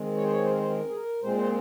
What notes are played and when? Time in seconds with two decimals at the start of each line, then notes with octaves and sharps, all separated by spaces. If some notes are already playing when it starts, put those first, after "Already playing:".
Already playing: D#3 G#3 C4
0.17 C#5
0.24 C5
0.31 C#5
0.43 C5
0.51 A#4
0.58 C5
0.70 A#4
0.89 G#4
0.96 A#4
1.22 A#2 G#3 C4 C5
1.36 C5